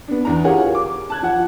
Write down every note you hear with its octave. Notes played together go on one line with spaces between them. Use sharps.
B3 D4
E2 D4 A#5
F4 G4 G#4 A#4 C#5 F#5
D6
A5 F#6 G#6
F3 F#5